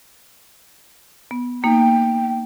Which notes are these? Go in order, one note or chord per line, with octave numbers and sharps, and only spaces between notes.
B3
A#3 D#4 G5